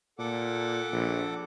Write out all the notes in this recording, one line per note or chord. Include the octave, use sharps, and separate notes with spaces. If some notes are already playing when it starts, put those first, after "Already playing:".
A#2 A4 F#5 D6
A#1